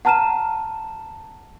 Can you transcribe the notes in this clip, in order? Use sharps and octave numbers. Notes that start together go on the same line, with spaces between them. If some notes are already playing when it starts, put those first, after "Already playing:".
F#5 A5 A#5 F6 D#7 E7